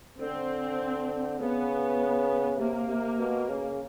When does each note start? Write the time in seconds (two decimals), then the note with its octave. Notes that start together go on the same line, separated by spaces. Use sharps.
0.20 D3 C4
1.40 C#3 B3
2.59 C3 A#3
2.89 C3
3.19 B2
3.49 C#3